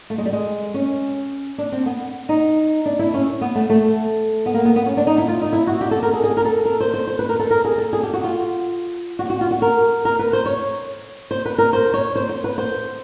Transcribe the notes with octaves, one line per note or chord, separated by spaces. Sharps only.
A3
G#3
G3
G#3
C#4
D4
C4
B3
D#4
D4
E4
C#4
B3
A3
A3
B3
A#3
B3
B3
C#4
D4
D#4
E4
F4
D#4
E4
F#4
G4
A4
A#4
G#4
G#4
A#4
A4
A#4
C5
C5
C5
B4
A#4
A4
A#4
G#4
A4
G#4
G4
F#4
F4
F#4
G4
F#4
F4
F#4
A#4
A#4
B4
C5
C#5
C5
B4
A#4
C5
C#5
C5
C5
B4
C5